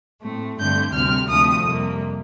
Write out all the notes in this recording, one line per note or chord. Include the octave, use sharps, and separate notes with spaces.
A2 A3 C4
G2 D3 A3 C4 G6
D2 C3 G3 C4 F6
D2 C3 F3 A3 C4 D#6
F2 C3 G3 A#3